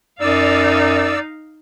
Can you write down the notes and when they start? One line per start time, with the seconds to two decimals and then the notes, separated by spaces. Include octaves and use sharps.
0.20 F#2 D#4 D5 F5 E6